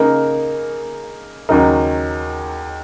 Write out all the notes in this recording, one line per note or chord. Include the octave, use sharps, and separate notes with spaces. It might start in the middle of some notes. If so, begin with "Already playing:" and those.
Already playing: C#3 A#3 D#4 A#4
D#2 C#3 F#3 D#4 A#4